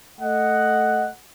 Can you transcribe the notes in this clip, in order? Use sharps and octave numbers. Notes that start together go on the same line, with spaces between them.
A3 D#5 F#5